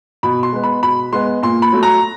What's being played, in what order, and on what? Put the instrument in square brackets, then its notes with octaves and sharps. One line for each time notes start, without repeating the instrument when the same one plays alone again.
[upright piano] B2 B5
C6
G#3 B3
B5
B2 B5
G#3 B3 C6
A#2 C6
B5
F#3 A3
A#5